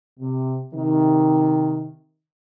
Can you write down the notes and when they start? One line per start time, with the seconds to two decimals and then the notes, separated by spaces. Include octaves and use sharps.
0.20 C3
0.74 C3 D#3